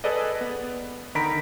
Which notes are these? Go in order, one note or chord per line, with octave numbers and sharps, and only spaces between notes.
G#4 A4 B4 D5 D#5
B3
D3 D#3 A#5 B5 B6 D7